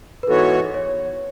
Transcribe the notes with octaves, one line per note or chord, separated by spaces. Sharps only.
B4
G#2 E3 B3 F#4 A4 C#5
C#5